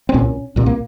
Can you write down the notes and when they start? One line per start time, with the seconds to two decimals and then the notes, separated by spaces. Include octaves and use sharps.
0.09 C4
0.14 C2 A#2 C#4
0.56 C2 A#2
0.66 A#3